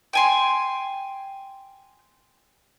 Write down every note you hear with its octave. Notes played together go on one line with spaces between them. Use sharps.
G5 G#5 C6